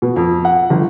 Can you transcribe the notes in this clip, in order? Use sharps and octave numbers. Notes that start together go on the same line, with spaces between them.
B2
F2
F#5
G1